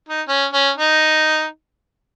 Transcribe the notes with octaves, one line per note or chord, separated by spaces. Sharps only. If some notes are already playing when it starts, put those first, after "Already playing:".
D#4
C#4
C#4
D#4